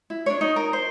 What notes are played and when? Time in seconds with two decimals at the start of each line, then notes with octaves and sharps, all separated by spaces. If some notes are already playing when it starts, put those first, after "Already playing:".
0.10 E4
0.26 D4 C#5
0.41 D#4
0.56 A#4
0.73 C5